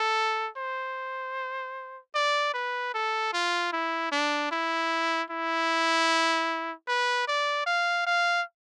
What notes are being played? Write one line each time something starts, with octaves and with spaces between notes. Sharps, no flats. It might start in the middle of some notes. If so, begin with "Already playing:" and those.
Already playing: A4
C5
D5
B4
A4
F4
E4
D4
E4
E4
B4
D5
F5
F5